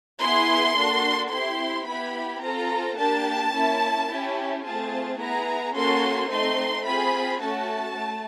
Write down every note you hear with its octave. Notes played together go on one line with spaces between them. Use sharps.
B3 E4 G#4 C6
A#3 D4 F#4 A4
C4 E4 G4 C6
B3 E4 G4 B5
C4 F4 A4 A#5
A#3 D4 G4 A5
A#3 C#4 E4
C#4 E4 G4
A3 C4 F4 G#4 A5
B3 E4 G#4 A#5
A#3 C#4 F#4 A4 C6
A3 C4 D#4 C6
C4 F4 G#4 B5
A3 C#4 F#4 A4 A5
A3